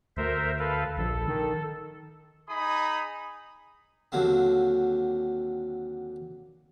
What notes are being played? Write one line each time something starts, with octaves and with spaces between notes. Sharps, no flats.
D2 A#4 C5 E5
A4 B4 F5
A#1 A4
D#3
D#4 G#4 B5 D#6
D#2 D3 F#3 A#3 C4